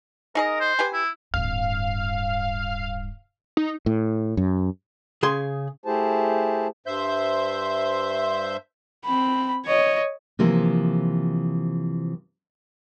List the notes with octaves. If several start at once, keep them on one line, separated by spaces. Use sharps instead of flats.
D#4 G#4 A#4 D#5
C5
G4 B4 G#5
E4
D1 G2 F5
D#4
A2
F#2
C#3 G#4 C6
A3 E4 G4 G#4 C5 A5
G2 C5 E5 G6
C4 B5
C#5 D#5
C3 E3 F3 A#3 E4